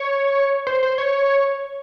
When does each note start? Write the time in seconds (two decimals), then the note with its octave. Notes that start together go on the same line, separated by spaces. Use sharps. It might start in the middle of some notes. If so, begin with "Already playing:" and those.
Already playing: C#5
0.67 C5
0.83 C5
0.98 C#5